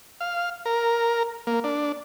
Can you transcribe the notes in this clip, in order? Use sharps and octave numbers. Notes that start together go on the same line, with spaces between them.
F5
A#4
A#3
D4